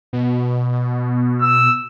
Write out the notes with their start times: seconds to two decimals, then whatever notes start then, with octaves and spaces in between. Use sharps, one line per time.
0.13 B2
1.42 E6